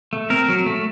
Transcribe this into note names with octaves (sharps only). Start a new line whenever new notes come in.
A3
C4 A#4
F#3
A3